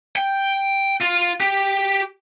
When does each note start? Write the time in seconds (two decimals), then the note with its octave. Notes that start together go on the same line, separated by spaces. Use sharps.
0.16 G5
1.01 F4
1.40 G4